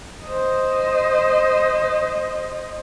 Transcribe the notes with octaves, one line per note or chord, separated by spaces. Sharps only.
C5 D#5